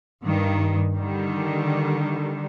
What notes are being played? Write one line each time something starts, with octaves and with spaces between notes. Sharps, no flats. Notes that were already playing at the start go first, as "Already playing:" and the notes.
G2 D#3
D3 D#3 G3